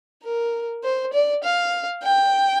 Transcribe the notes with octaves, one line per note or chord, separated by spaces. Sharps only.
A#4
C5
D5
F5
G5